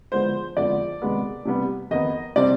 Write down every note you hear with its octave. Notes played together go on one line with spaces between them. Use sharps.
D3 F3 G#3 B3 C5
F2 D3 F3 G#3 B3 D5
C3 D#3 G#3 B3
C3 G3 B3
F2 D#3 B3 D#5
C3 G3 C4 D5